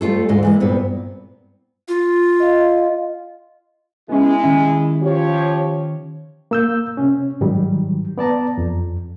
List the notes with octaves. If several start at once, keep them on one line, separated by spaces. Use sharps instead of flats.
G3 A3 C#4 F4 A4
D2 G#2 G#3 A4
E3 G#3 A#3
G2 A#2 B3 C4
F4
D#5 F5
G#3 B3 C#4 E4
D#3 C#4 E5
F3 G4 C#5
A#3 E6 G6
C3 C#4
G#2 D#3 F#3 G3
B3 D5 A5 A#5
F2